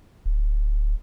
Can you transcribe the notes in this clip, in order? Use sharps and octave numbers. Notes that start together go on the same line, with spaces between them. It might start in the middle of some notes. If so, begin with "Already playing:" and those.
D1